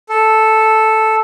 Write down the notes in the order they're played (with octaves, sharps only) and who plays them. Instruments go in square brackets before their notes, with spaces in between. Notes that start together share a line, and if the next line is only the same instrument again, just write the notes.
[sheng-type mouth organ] A4